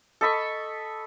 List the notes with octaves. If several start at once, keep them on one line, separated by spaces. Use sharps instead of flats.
A4 D#5 B5 C#6